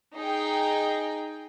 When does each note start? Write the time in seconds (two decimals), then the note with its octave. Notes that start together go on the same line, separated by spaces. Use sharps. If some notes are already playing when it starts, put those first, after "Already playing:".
0.16 D#4 G#4 G5